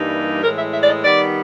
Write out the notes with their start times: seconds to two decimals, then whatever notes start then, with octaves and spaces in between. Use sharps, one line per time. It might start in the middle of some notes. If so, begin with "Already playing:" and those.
Already playing: G2 E3 G3 A#3 D#4
0.43 A2 E3 G#3 A#4
0.58 E5
0.74 E5
0.84 D5
0.89 D#5
1.04 D#3 G3 B3 D5